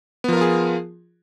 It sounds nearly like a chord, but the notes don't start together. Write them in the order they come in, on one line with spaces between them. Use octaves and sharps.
B3 F3 A#4 F4 G#4